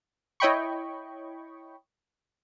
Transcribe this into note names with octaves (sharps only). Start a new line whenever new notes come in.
E4 C#5 D#5 G5 B5 C#6